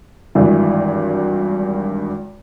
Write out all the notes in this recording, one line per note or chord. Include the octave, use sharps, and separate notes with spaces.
G#1 G2 E3